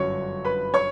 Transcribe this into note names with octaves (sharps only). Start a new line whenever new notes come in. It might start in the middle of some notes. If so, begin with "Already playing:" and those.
Already playing: G1 F#2 D3 F#3 C#5 C#6
B4 B5
C#5 C#6